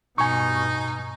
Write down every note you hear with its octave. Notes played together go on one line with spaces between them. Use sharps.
G2 B2 D#4 G#5 C#6